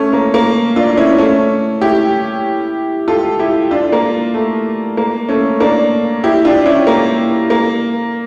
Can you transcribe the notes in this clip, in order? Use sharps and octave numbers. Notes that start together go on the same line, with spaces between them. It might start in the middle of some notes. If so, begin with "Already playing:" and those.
Already playing: A3 C#4
A#3
A#3
D4 F4
C#4 E4
A3 C#4
E4 G4
F4 A4
E4 G4
D4 F4
A#3
A3
A#3
A3 C#4
A#3 D4
E4 G4
D4 F4
C#4 E4
A#3
A#3